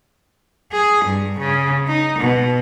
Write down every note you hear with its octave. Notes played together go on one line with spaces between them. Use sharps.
G#4
G2
C#3
D#4
B2